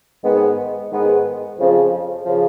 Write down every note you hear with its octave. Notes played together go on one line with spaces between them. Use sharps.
G#2 D#3 G#3 B3
G#2 D#3 G#3 B3
F2 C#3 F3
C#3 F3